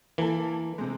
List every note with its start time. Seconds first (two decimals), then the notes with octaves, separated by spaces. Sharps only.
0.18 E3 A#3 A4
0.78 C3 G#3